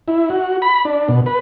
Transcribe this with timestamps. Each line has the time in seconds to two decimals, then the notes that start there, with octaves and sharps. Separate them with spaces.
0.08 E4
0.30 F#4
0.62 B5
0.85 D4
1.08 B2
1.26 B4